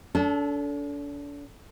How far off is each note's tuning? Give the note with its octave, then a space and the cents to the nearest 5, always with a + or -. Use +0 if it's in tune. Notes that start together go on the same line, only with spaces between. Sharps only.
D4 -40 A4 +0